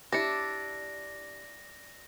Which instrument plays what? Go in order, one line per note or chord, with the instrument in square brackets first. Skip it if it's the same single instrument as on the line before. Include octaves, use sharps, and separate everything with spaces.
[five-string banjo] D4 E4 [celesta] G4 C#7 [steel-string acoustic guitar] D5 [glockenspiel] A#6